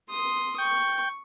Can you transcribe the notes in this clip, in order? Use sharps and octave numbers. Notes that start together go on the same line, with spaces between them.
C6 D#6
G5 C#6